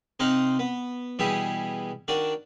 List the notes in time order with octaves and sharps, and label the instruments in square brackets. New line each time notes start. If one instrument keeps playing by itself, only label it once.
[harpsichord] C3 D#4 C5 D#5 F5 F#5
B3
B2 E3 G3 E4 G4 G#4
D#3 D4 F#4 D5